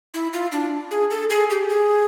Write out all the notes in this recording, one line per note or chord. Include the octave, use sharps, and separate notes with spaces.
E4
F4
D4
G#4
A4
G#4
G4
G#4